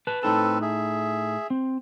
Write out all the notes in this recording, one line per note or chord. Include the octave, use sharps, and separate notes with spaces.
B4 A5
A2 C4 D#4 A4 B4 A5
G#4 E5
C4